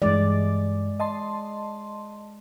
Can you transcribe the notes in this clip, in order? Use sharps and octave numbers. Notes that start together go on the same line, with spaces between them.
G2 E3 G#3 D5
D#5 A5 C6